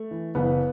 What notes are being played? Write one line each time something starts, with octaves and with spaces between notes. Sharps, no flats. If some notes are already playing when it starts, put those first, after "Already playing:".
Already playing: A3
E3
F#1 B3